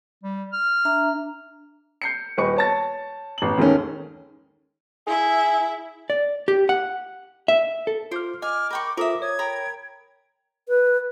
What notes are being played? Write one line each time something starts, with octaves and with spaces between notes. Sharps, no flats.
G3
F6
D4 E5 A#5
G6 C7 C#7
D#1 B4 D#5 C#6 C#7
C#5 A5 A6
A1 F#7
D#2 D#3 G#3 A3 C#4
E4 G#4 E5
D5
G4
F#5
E5
A4
F4 C5 D6 F6
D#5 G#5 D6 F6
A#4 G5 B5 C#6
F4 A4 A#4 C5 E5 D6 D#6
C#5 D#6 G#6
A#4 G5 A#5 B5
B4